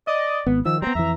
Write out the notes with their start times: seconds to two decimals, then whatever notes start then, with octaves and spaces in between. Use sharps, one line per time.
0.07 D5 D#5
0.46 G#1 B3
0.65 D#3 F3 E6
0.82 G3 B3 C4 A#5
0.95 F2 E3 E5